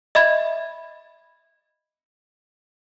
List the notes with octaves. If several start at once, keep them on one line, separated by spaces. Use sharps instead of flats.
D#5 E5 B5 G#6